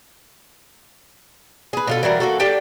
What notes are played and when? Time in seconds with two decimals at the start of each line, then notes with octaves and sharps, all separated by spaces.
1.73 G#4 B4
1.87 B2 F4 A4
2.03 E3 F#3 G3 A#4
2.20 A#3 F#4 A4
2.40 D4 G4 A4 G5